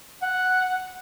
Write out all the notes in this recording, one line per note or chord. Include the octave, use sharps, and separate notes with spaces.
F#5